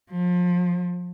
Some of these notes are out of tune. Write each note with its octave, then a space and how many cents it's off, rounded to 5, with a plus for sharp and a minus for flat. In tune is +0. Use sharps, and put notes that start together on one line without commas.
F3 +30